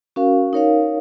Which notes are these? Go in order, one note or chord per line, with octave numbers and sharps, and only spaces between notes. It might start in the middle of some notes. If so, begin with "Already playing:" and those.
C#4 F#4 A#4 F5
D#4 A#4 C#5 F5